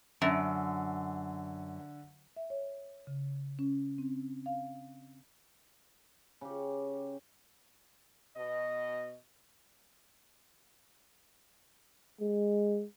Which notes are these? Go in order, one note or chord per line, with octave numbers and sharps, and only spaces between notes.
F#2 D3
E5
C#5
C#3
C#4
C4
F5
C#3 G4
B2 D#5
G#3